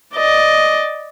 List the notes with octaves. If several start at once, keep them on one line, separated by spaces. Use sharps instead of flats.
D5 D#5